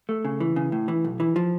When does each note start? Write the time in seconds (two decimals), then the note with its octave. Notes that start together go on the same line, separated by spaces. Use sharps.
0.09 A3
0.25 C#3
0.40 E3
0.56 C#3
0.72 A2
0.88 E3
1.04 B1
1.20 E3
1.36 F3